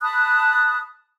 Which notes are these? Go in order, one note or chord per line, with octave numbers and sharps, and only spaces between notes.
A5 B5 D#6 F#6